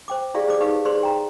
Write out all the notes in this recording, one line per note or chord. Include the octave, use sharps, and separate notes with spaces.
C5 G5 D6
E4 G4 G#4 D5 F5
G#4 C5 D5 D6
D#4 G4 G#4 B4 F5
G#4 B4 C5 D5 C6
G5 A#5